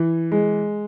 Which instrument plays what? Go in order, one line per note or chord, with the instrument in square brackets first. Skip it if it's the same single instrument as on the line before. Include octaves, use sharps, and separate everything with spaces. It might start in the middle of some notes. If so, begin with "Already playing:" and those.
Already playing: [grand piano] E3
G#3